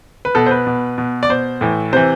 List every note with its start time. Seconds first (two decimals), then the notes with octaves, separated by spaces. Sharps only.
0.25 B4
0.35 B2 A4
0.46 C5
0.51 B4
0.67 B2
0.98 B2
1.23 D5
1.29 B2 C5
1.61 A2 E3
1.93 C3 E3 C5